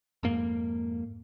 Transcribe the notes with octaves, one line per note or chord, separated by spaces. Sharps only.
F2 G#2 A#3